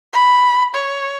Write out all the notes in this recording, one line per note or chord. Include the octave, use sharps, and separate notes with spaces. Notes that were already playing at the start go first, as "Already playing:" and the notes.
B5
C#5